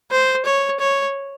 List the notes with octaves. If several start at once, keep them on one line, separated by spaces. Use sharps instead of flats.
C5
C#5
C#5